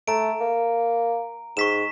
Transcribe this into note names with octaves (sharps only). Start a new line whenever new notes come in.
A3 A#5 D7
A#3
G#2 C#6 B6 E7